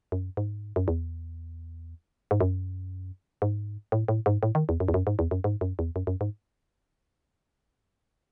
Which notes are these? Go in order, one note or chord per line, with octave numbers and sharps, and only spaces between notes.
F#2
G#2
F#2
E2
G#2
F#2
G#2
A2
A2
G#2
A2
D#3
E2
F#2
E2
F#2
G#2
E2
F#2
G#2
F#2
E2
F#2
F#2
G#2